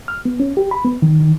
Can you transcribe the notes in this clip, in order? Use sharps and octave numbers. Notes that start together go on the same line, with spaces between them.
F6
B3
C#4
G4
B5
B3
D#3
D#3